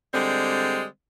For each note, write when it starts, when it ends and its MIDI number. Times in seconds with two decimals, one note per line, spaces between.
0.14 0.85 50
0.14 0.85 55
0.14 0.85 56
0.14 0.85 60